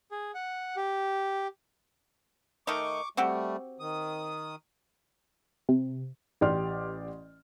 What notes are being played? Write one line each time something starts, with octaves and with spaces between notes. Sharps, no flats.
G#4
F#5
G4
D#3 A3 D#4 C#6 D6
G3 A3 C4 F#4 G4
D#3 D#6
C3
A1 G4 D5 C6 F6